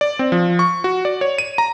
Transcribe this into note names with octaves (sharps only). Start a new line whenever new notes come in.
D5
C4
F3
C#6
F#4
D5
C#5
D#7
A#5